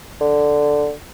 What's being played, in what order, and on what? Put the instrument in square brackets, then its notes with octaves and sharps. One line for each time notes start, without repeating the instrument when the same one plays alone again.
[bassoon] D3